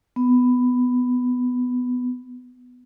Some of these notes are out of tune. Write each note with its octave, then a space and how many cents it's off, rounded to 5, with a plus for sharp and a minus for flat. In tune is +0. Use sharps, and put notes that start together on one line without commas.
B3 +10